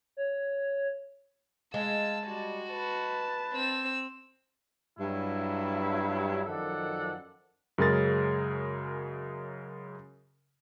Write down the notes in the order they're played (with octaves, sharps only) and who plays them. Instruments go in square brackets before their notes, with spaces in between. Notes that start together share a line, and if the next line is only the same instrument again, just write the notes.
[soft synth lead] C#5
[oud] G#3 [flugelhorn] F5 [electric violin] A5 [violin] E6
[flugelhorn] G3 [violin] F#4
[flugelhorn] B4 [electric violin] A5
[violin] C4 E6
[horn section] G2 F#3 E4
F#2 D#3 F3 A4 D5 F#5
[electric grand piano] F#2 C#3 G#3 G#4 A#4 A6